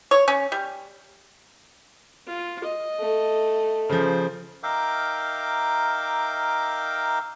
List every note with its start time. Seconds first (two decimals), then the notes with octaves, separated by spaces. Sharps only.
0.11 C#5
0.28 C#4
0.52 G3
2.27 F4
2.64 D#5
2.99 A3
3.89 C#3 F3 C5
4.63 D#4 A#4 E5 F5 G5 D6